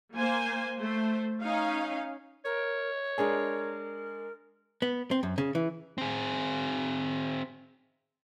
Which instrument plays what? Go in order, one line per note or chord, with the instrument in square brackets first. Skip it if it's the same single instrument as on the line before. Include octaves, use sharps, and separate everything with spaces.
[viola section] A#3 C5 G#5
A3 C5
C#4 D#4 F5
[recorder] A#4 [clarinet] C#5
[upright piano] G#3 D4 G#4 [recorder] A#4
[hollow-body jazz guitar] B3
C4
F#2
C#3
E3
[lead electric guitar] C4 G#4